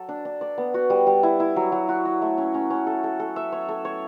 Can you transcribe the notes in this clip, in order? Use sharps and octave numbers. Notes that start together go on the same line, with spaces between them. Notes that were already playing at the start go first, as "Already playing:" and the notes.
Already playing: F#3 A4
D4
D4
D5
B3
F#4
G3
G3
E4
E4
F#3
F#3
F#4
F#4
A3
C#4
C#4
C#4
A4
A4
A4
E5
C#5
A4
C#5